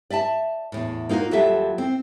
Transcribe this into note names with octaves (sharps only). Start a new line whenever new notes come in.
D5 E5 G#5 A5
E2 A2
A#3 D#4 F4 F#4 A#4
D#2 F#3 G3 F4 A4 E5
C4